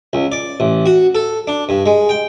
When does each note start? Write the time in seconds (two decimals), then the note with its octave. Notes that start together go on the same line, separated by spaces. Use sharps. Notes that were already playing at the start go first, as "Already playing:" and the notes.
0.13 C#2
0.32 D5
0.60 A1
0.86 F#4
1.15 A4
1.47 D4
1.69 G2
1.86 G#3
2.09 G5